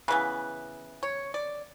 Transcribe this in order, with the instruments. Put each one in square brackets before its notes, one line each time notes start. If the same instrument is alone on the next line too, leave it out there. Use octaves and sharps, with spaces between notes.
[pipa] C#3 E3 B3 B4
C#5
D5